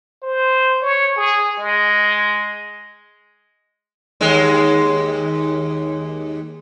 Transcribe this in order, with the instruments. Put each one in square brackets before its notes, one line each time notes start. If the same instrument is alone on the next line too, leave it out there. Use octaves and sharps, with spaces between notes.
[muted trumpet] C5
C#5
G#4
G#3
[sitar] D#2 G#3